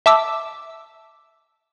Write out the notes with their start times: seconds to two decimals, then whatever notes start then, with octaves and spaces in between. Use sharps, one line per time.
0.06 E5 A5 D6 E6